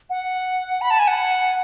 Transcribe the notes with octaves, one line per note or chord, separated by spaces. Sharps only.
F#5
B5
A5
G#5
F#5